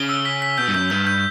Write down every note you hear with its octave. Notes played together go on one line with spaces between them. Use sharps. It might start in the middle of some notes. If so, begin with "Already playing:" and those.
Already playing: C#3 G7
E6
B6
B6
B2 G6
G2
F#2 G6
G2 G6
G6